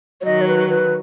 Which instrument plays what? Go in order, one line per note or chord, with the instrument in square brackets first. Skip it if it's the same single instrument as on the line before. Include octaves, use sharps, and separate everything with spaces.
[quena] C#5
[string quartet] D#3 F#3 [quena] D#5
[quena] C#5
B4
B4